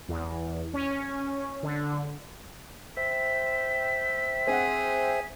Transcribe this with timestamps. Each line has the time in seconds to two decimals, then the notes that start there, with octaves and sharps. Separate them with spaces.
0.08 E2
0.74 C#4
1.63 D3
2.97 C5 E5 G5 B6
4.47 C4 G#4 F#5